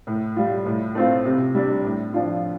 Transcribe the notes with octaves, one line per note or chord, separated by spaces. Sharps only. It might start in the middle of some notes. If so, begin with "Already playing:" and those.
A2
G3 F4
A2
A3 C4 F4
C3
G3 D4
A2
F3 D4 F4